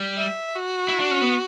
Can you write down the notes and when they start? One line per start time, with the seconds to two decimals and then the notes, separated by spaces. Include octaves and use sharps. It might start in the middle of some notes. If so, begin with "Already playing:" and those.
Already playing: G3
0.17 E5
0.55 F#4
0.88 E4
1.00 D4
1.11 C#4
1.21 B3